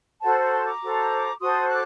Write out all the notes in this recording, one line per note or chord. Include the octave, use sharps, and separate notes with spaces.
F#4 A4 C5 F#5 A5
A#5
A5 C6
A#5 D6
F#4 A4 C5
F#4 A4 C5 C6 D#6
D6 F#6